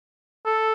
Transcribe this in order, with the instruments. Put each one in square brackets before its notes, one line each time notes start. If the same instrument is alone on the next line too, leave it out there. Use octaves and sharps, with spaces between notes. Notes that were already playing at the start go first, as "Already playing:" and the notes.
[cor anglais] A4